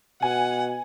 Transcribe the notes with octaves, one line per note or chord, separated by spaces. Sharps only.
B2 F#5 G#5